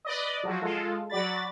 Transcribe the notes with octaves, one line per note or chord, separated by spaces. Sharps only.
B4 D5 D#5
F3 F#3 F#4
G#3 F4 A4
F#3 F#4 D5 B5 A6